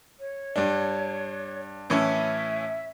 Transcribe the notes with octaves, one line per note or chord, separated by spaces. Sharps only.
C#5
G2 D4
A2 E3 C#4 E5